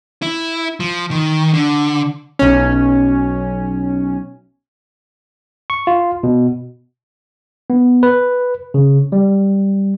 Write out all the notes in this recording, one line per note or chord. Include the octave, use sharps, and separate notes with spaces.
E4
F3
D#3
D3
B1 C#4
C#6
F4
B2
B3
B4
C#3
G3